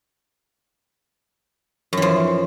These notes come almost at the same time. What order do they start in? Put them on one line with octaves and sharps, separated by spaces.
F#2 E3 F3